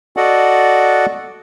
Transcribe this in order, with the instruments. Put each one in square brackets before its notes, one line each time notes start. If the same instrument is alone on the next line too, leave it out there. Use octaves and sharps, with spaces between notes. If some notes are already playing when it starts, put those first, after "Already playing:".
[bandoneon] F#4 A4 D5 D#5 F#5